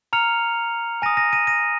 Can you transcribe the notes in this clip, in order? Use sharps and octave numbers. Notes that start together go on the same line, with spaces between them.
A#5 F6 C#7 F7
G#5 D#6 A#6 D#7
A#6 D#7
A#6 D#7
A#6 D#7